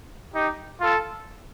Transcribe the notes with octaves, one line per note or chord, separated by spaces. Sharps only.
D#4 G4
F4 A4